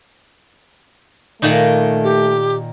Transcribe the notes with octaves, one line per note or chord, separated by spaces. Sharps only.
A#2 D#3 A3 D#4
G4